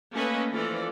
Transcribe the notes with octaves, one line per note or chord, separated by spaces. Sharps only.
A3 A#3 C#4 A4 B4 D#5
E3 F3 F4 A4 D5